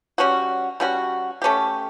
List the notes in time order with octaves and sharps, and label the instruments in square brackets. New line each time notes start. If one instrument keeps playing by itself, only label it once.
[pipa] G3 C#4 F#4
G3 C#4 F#4
A3 C#4 G4